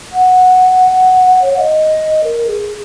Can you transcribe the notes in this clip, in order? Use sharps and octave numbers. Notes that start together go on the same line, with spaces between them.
F#5
C#5
F#5
D#5
A#4
G#4